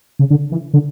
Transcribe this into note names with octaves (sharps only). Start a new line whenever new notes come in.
C#3
D3
E3
D3